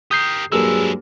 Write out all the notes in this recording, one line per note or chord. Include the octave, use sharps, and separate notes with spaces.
G4 A#4 D#6 G6 C7
G2 F#3 G#3 A#3 E4 G#4 A4 E6